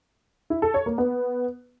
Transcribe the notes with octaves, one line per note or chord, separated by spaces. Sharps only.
E4
A4
C#5
A#3
B3